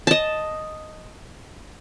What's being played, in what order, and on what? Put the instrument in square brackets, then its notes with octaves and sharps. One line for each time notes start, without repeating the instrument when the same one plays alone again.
[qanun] D#5 A5